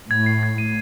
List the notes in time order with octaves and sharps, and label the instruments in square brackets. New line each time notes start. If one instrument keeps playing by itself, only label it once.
[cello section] A2 [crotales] G#6
[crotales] C7
G#6
D#7